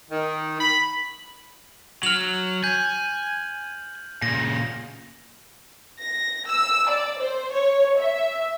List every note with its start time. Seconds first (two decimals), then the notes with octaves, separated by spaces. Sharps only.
0.10 D#3
0.60 B5
2.03 F#3 F6 F7 F#7
2.64 G#5 G6
4.22 A#2 C#3 A#6
6.01 A#6
6.50 E6
6.90 D5
7.20 C5
7.54 C#5
8.00 E5